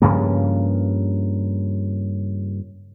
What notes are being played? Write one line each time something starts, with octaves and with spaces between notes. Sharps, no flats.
G2 C#3 F3 A#3